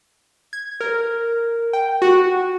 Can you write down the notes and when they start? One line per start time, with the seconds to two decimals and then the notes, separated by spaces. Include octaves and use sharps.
0.53 G#6
0.81 A#4
1.73 G5
2.02 F#4